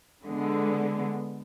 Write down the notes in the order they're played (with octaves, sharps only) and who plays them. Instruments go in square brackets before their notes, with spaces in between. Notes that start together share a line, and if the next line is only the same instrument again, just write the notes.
[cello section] D3 G#3 B3